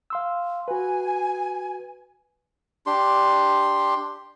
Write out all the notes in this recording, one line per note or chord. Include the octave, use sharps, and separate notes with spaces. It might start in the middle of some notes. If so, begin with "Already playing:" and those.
F5 C6 E6
F#4 B4 G#5
D4 G4 C6